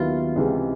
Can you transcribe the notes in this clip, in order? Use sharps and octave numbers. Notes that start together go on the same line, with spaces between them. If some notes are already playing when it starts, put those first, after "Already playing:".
Already playing: D#2 D#3 F#3 B3 E4 F4
C#2 C3 E3 G#3